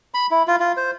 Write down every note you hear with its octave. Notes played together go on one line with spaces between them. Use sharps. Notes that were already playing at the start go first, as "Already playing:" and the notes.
B5
E4
F4
F4
C5